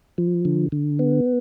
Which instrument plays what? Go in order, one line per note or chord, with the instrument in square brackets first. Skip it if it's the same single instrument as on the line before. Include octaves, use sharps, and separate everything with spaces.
[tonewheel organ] F3
D3
D3
B3